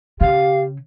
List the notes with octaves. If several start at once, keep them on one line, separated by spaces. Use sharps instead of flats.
C#3 G4 F5